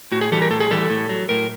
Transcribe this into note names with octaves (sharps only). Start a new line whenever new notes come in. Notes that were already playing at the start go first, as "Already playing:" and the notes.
A2 F#4
G#4
E3 G3 A4
A#4
A2 A4
G#4
E3 G3 A4
A2
F#3
A2 A#4